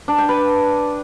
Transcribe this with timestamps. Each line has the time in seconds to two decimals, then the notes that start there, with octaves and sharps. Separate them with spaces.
0.08 D4
0.18 G5
0.29 B4